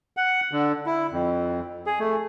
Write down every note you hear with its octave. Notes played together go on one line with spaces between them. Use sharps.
F#5
D3
E4
F2
G#4
A3